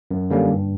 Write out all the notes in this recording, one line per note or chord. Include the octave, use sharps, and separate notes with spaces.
F#2
D3 G3 A#3 C#4
G2